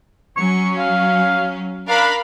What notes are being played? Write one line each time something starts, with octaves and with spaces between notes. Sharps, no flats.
F#3 C#4 C#6
F5
D4 A#4 F5 B5